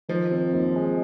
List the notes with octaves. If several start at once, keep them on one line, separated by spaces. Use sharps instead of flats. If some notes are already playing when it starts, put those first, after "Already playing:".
D#3 F3
C4
D#2
G#3